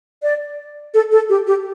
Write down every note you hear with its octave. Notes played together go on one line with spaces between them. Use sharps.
D5
A4
A4
G4
G4